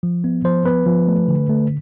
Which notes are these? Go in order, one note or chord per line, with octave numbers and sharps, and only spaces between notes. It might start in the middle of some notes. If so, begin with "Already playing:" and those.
F3
B3
F3 C5
B3 B4
F3
A3
D3
A3